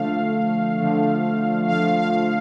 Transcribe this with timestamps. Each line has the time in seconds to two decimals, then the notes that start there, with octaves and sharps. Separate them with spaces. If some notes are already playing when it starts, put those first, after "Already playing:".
Already playing: D3 F3 A3 F5
0.79 D3 F3 A3
1.68 D3 F3 A3 F5
1.97 F5